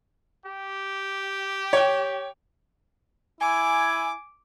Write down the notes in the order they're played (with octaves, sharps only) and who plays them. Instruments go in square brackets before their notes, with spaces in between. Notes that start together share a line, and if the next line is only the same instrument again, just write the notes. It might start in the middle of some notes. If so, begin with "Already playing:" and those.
[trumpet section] G4
[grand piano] C#5 G5
[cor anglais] E4 [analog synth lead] G#5 [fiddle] D6